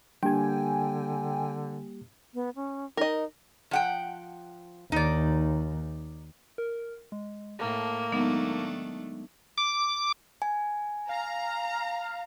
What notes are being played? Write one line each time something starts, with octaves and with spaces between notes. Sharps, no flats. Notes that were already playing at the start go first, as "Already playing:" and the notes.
D3 G3 A#3 D4 G4 G5 G#5
B3
C#4
D#4 A#4 D#5
F3 F#5 G5
D#2 D#4 D5
A#4
G#3
A2 A#3 A5
D#3 F#3 G#3 A3 B3 D4 D#4
D6
G#5
F5 A#5